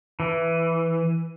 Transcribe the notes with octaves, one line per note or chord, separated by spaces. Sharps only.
E3